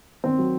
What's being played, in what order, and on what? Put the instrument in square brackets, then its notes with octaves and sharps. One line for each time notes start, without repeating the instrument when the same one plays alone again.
[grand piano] D#3 C4
F#3